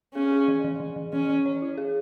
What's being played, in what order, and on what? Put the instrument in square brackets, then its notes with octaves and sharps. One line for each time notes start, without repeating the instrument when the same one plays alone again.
[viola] C#4 [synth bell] G#4
[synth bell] G#4
E3
E3
E3
E3
[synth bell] E3 [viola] C#4
[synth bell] E3
C#5
E4
G#4